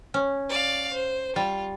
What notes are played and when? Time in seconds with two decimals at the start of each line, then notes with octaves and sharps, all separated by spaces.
0.14 C#4
0.49 D5 F5
0.94 C5
1.36 G3 F4